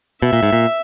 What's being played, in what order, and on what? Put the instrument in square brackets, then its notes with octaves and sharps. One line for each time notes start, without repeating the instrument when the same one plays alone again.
[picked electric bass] B2 [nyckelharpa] E5
[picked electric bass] A#2
G#2
A#2